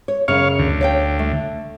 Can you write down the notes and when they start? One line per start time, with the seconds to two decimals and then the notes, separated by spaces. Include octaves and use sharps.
0.08 C#5
0.28 F#2 C#3 C#5 F5
0.59 D2
0.81 C#5 F5 G5
1.19 A3